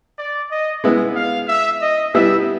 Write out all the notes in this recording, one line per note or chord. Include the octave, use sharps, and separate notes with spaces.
D5
D#5
G#3 B3 E4
F5
E5
D#5
G3 B3 E4 E5